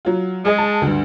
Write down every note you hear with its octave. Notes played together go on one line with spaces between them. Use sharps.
F#3 F4
G#3 G#4 D#5
A5
D2 G2